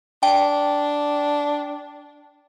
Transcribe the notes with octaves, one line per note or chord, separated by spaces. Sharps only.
D4 G5